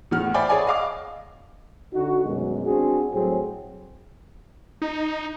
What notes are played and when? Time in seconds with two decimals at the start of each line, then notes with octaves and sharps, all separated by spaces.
0.11 E2 A2 F#5 F6
0.34 C5 D5 E5 G5 G#5 B5
0.48 G#4 C#5 D5 G#5 B5
0.67 D#5 F5 D6
1.93 D3 D#4 F#4
2.24 F#2 B2 D#3 G3 G#3
2.65 C4 D4 F#4 G#4
3.14 A2 F#3 G3 C4 G#4
4.82 D#4